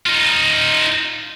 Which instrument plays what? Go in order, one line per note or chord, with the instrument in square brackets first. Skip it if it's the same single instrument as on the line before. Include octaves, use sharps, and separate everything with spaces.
[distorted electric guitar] D#4 F4